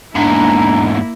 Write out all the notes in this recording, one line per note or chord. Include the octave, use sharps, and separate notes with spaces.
E2 G#2 A#3 D4 E4 A#5